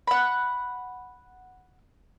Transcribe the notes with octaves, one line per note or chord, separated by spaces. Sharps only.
F#5 B5